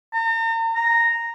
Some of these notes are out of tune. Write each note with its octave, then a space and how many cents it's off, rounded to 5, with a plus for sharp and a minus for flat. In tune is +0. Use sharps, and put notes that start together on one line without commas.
A#5 -40
A#5 -5